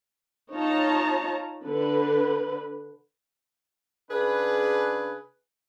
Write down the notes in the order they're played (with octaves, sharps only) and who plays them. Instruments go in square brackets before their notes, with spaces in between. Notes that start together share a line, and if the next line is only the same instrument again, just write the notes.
[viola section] D#4 F4 C#5 A5 A#5
D3 B4
[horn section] C#3 D4 G#4 B4